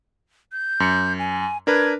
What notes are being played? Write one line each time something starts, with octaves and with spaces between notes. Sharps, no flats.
G6
F#2 C#7
G#5
D4 A#4 B4 G#6